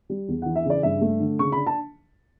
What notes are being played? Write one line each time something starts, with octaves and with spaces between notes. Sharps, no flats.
G3
E2
E3 F#5
E5
C#3 D5
G2 E5
A3
D3
C#3 C#6
D4 B5
A5